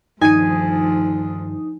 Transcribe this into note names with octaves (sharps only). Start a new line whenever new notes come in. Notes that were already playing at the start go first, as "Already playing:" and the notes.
D2 G2 D#3 F3 D#4 G#5 G#6 D#7